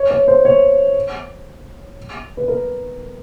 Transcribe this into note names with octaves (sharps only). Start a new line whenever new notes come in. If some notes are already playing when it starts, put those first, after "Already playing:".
Already playing: C#5
C#5
C5
C#5
B4
A#4